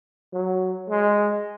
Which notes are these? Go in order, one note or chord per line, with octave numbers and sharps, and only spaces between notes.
F#3
G#3